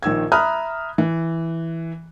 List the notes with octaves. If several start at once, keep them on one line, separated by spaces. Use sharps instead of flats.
A#1 D#3 E6 G#6
E5 A#5 B5 D#6 F6 F#6
E3